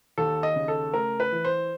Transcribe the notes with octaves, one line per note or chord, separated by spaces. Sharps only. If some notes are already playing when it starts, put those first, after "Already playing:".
D#2 A4
D#5
C#3
A4
A3 A#4
B4
E3
C5